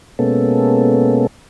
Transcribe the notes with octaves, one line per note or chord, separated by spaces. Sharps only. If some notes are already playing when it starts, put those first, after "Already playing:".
B2 G#3 A#3 B3 C#4 A4